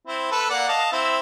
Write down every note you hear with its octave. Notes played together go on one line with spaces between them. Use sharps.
C4 E4
A4 B4
A#3 D5 F#5
D#5 F5 A5
C4 E4 E5